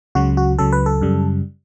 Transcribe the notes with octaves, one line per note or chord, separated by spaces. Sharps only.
C#2 C#3 F#3 F#4
F#4
C#2 C#3 F#3 A4
B4
A4
F#2 C#3 G3